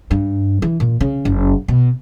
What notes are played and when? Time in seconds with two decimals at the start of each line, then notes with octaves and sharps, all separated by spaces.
0.11 G2
0.62 E3
0.80 A#2
1.01 C#3
1.25 F#1
1.68 B2